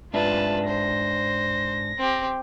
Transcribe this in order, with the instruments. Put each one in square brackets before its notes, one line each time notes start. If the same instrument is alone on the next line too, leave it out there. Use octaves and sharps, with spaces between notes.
[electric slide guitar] G#2 D4 E5 [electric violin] F4 A5 [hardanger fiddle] B4
[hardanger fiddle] C5 [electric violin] A#6
[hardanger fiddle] C4 G4